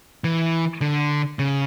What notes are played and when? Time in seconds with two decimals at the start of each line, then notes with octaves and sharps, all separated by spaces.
0.24 E3
0.81 D3
1.39 C#3